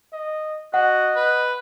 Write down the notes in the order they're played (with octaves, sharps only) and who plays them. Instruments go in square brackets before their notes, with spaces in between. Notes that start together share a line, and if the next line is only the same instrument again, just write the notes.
[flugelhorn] D#5
[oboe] F#4 [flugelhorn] D#5 [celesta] F#5
[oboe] B4